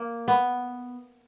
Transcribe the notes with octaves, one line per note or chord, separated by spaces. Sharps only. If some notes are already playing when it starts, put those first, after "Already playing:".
Already playing: A#3
B3